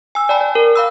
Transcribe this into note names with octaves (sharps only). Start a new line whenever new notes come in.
G#5 E6
D5 G5 A5 B5
D5
A#4
F5 B5 E6